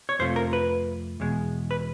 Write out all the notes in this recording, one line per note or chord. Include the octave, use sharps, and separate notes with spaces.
C#5
F2 C3 F3 A3 C5
A#4
B4
E2 B2 G#3
B4